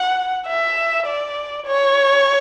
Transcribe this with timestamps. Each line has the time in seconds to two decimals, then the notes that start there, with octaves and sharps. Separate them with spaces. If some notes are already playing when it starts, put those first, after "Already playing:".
Already playing: F#5
0.47 E5
1.06 D5
1.66 C#5